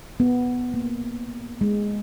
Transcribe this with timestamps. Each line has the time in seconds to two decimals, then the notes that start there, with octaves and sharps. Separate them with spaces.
0.20 B3
0.74 A#3
1.61 G#3